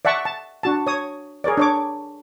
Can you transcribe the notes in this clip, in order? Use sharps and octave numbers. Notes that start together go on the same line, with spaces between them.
D5 E5 F#5 A5 C#6
A5
D4 F#4 A5
C#5 D#6
G#4 A#4 C#5 D5
D4 C#5 D6